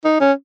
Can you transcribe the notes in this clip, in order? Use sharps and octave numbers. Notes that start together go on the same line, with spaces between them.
D#4
C#4